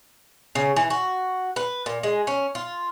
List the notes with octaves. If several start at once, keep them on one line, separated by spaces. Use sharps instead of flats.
C#3
E3
F#4
B4
A#2
G#3
C#4
F4